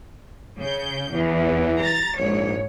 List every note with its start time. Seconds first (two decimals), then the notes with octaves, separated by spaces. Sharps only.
0.59 C#3 G6
1.14 E2 E3
1.83 A#5 A6
2.19 A#1 G#2 C#5